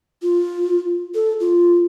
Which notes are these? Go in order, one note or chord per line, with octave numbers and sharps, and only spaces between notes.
F4
A4
F4